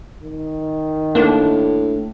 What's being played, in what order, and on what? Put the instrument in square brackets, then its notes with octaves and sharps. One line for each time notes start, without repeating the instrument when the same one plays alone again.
[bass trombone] D#3
[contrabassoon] A2 [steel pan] A#3 [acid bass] D4